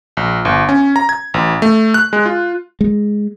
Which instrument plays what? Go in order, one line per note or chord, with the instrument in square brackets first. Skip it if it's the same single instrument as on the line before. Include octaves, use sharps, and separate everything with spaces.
[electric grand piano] A#1
G1
C#4
A#5
G#6
A1
A3
F#6
G#3
F4
[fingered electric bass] G#3